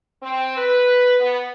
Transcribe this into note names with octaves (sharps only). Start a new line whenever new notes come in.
C4
B4
B3